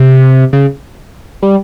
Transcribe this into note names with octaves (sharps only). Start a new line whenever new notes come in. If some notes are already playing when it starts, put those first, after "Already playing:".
Already playing: C3
C#3
G3